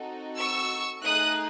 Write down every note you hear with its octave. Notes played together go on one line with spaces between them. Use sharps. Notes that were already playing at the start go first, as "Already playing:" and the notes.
Already playing: C4 D#4 F#4 A4
C#6 E6
A3 D#4 G#4 D#6 F#6